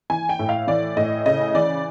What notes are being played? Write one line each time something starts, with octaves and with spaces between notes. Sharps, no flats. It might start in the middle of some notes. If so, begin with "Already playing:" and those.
E3 G#5
G5
A2
F5
E3 D5
A2 D#5
C#3 D#5
E3 D5